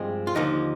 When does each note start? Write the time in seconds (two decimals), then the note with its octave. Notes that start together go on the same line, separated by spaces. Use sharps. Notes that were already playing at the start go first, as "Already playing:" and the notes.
Already playing: G2 F3 G#3 C4
0.27 F4
0.35 D#2 D3 F3 A#3 D#4